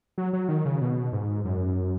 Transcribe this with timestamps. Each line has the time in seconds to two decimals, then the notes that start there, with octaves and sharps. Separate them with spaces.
0.18 F#3
0.33 F#3
0.49 D#3
0.65 C#3
0.81 B2
1.13 G#2
1.45 F#2